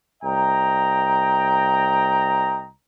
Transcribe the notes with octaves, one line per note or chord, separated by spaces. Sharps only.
C2 D#5 G5 A#5